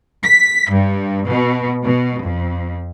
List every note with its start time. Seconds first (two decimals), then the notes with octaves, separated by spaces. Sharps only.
0.24 B6
0.72 G2
1.28 B2
1.83 B2
2.22 F2